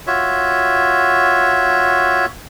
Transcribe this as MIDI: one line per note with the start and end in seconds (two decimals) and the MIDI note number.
0.07 2.26 65
0.07 2.26 66
0.07 2.26 73
0.07 2.26 76